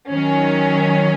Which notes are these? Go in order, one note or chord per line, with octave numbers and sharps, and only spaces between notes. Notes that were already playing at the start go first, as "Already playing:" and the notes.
D#3 F#3 C#4